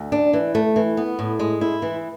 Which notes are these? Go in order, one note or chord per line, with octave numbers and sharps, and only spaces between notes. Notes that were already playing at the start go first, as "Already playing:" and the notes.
Already playing: D2
D4
E3
A3
E3
B3
A2
G#3
E4
E3